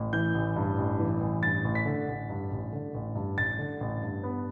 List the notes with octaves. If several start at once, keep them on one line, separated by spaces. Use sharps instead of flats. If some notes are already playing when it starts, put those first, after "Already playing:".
Already playing: A1
E3 G6
A1
G2
A1
E3
A1
G2 A6
A1
B6
D3
A1
G2
A1
D3
A1
G2
A1 A6
D3
A1
G2
B3